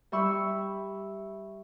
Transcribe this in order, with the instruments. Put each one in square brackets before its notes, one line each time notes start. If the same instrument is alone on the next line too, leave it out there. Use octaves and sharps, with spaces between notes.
[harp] G3 E5 B5 C#6 E6